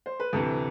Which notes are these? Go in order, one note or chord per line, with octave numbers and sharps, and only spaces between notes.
C5
B4
D2 C3 E3 A4